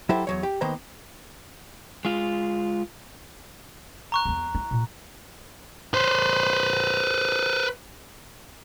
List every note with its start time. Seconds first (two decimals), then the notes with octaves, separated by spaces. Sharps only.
0.09 F#3 E4 G4 A4 C5 E5
0.27 E2 F#3 C#5
0.43 G4
0.61 D#3 A#3 B3 C5 A#5
2.05 G#3 F4
4.12 A#5 C#6 F#6
4.25 E2 F3
4.55 E4
4.71 A#2
5.94 B4 C5